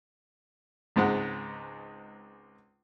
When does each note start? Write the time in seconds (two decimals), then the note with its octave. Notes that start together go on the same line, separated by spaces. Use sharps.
0.96 C#2 G#2 G#3 C4 F#5